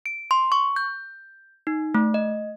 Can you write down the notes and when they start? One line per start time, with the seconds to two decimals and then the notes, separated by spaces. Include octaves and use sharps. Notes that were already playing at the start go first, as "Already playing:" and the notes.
0.06 D7
0.31 C6
0.52 C#6
0.76 G6
1.67 D#4
1.95 A3
2.14 D#5